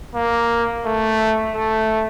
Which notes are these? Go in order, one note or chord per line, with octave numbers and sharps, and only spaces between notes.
A#3
A3
A3